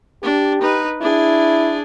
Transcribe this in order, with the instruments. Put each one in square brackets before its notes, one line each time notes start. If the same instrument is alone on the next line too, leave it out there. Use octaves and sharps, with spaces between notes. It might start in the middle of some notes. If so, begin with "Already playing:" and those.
[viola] D4 [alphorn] G4
[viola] D#4 B4
[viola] D4 G#4 [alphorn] E4